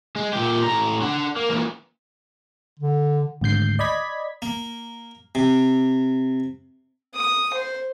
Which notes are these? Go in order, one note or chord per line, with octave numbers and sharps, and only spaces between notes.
G#3
A#2 G4
A2 A#5
D4 F#5
A#3
A#2 E3
D3
G#1 D2 G6 C7
D5 D#5 B5 G#6 B6
A#3
C3
D#6
C5